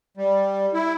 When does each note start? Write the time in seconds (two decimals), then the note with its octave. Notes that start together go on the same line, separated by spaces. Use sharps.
0.17 G3
0.74 E4